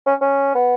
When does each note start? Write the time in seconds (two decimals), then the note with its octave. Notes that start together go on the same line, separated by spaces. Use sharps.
0.07 C#4
0.21 C#4
0.55 B3